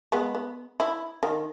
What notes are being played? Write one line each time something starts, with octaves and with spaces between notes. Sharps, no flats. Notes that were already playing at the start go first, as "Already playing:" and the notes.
G#3 B3
B3
E4
D#3